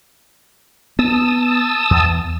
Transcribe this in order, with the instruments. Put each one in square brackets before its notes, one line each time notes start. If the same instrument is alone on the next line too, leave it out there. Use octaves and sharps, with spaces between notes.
[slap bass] B3 [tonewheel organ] A5 D#6 E6
[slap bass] E2